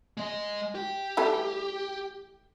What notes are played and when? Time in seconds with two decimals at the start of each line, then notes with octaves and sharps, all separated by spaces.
0.17 G#3 D#5
0.75 G4
1.17 E3 G3 A3